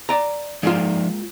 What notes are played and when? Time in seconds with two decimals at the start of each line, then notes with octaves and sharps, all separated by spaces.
0.09 D5 A#5
0.63 F3 G#3 A#3 D#4 F4 D5